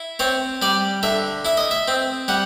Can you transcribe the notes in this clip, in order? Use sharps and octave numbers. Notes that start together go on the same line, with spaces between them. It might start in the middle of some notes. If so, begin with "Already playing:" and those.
Already playing: E4
C4 C#5
G3 D5
D3 E5
E4 E5
D#5
E5
C4
G3 F#5